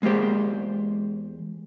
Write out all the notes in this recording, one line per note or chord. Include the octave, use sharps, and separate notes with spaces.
E2 G#3 A#3 G4 C5